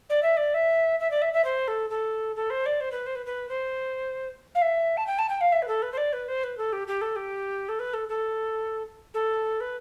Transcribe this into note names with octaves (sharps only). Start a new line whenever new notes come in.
D5
E5
D5
E5
E5
D5
E5
E5
C5
A4
A4
A4
C5
D5
C5
B4
C5
B4
B4
C5
F5
E5
A5
G5
A5
G5
F5
E5
B4
A4
B4
C5
D5
B4
C5
B4
A4
G4
G4
A4
G4
A4
B4
A4
A4
A4
B4